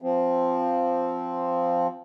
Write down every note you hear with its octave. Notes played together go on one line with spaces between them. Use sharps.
F3 C4